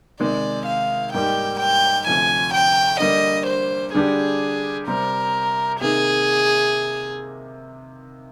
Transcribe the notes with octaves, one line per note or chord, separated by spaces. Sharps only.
C3 D#3 G#3 D5
F5
G#2 G3 A#3 D#4 G4 G5
G5
D2 C3 F3 G#5
G5
D3 G3 A#3 D#5
C5
D3 G3 D4 G4 G#4
C3 G3 C4 A#4
C3 D#3 A#3 D#4 G#4